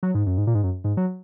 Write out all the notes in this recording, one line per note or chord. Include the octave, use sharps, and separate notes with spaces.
F#3
G#2
F#2
G#2
A#2
G#2
F#2
G#2
F#3